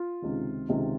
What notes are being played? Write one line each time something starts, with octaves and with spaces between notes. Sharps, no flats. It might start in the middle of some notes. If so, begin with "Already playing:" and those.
Already playing: F4
C#2 C3 D#3
C#2 C3 D#3